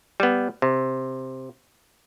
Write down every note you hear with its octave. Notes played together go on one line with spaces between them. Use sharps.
G3 B3
C3